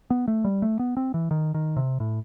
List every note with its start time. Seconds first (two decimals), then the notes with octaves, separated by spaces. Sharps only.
0.10 B3
0.28 A3
0.44 G3
0.62 A3
0.79 B3
0.97 C4
1.14 E3
1.31 D#3
1.54 D#3
1.76 C3
2.00 A2